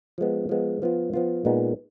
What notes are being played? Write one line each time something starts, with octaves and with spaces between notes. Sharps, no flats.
F3 G#3 B3
F3 G#3 B3
F3 B3 F4
F3 B3 F4
A#2 G#3 B3 D#4